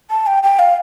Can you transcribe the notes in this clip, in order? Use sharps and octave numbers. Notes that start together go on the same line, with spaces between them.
A5
G5
G5
F5